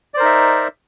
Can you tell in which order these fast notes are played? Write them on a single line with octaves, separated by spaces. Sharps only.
D5 C5 A#4 D#4 E5